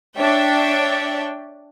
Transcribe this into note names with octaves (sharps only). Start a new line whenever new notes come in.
D4 C#5 E5 G5